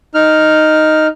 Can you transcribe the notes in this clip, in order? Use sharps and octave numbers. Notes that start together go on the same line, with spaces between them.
D#4 F6